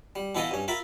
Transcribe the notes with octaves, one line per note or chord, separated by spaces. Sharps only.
G3
B2 E3 E4 A4 D#5 F5
G2 C#4
F4 A#4 E5 B5